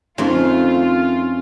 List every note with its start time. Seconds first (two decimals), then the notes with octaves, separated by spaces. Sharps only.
0.18 F2 D#3 A3 C#4 F4